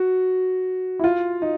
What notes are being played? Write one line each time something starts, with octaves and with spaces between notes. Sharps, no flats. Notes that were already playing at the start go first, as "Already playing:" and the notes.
Already playing: F#4
E4
F4
D#4